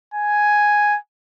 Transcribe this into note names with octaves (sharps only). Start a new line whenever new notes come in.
G#5